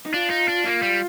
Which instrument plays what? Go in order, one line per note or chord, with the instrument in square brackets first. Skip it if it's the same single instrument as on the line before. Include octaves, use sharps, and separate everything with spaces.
[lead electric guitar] D#4
[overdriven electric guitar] D4 [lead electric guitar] F4
[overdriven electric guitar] D#4
D4
[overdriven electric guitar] A#3 [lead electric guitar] F4
[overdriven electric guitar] G3